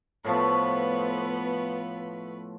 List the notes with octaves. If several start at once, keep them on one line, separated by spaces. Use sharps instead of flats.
A2 F3 A3 B3 B4